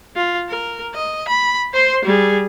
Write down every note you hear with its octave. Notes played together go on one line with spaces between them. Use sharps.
F4
A#4
D#5
B5
C5 C6
G3 G#4